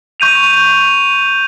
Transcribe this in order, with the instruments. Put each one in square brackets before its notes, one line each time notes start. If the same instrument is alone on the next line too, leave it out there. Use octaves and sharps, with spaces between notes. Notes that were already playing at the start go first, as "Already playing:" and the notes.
[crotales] C#6 G6 D#7 F7